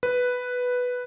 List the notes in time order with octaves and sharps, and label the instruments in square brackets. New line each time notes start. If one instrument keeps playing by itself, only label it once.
[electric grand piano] B4